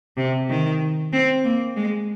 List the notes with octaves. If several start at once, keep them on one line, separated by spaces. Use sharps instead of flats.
C3
D#3
C4
A#3
G#3